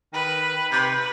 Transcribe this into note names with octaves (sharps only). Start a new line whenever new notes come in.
D#3 B4
C3 B4